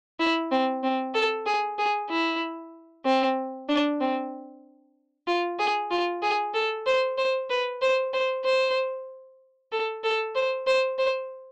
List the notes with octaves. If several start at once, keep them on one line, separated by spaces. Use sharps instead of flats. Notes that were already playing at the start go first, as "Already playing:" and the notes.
E4
C4
C4
A4
G#4
G#4
E4
C4
D4
C4
F4
G#4
F4
G#4
A4
C5
C5
B4
C5
C5
C5
A4
A4
C5
C5
C5